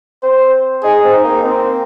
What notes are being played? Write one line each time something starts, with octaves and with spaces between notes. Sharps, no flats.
C4 C5
D#4 G#4
C4
D#4
A#3
C4